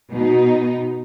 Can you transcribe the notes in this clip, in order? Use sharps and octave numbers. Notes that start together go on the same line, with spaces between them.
B2 D#4